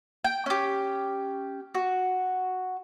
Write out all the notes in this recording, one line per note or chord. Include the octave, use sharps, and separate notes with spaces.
G5
C#4 G4
F#4